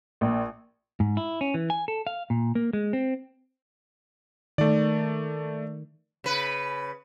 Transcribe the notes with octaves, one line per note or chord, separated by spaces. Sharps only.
A#1
G#2
E4
C#4
E3
G#5
A4
F5
A#2
A#3
G#3
C4
D#3 A3 D5
C#3 B4